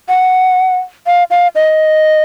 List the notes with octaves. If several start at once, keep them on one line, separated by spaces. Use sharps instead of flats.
F#5
F5
F5
D#5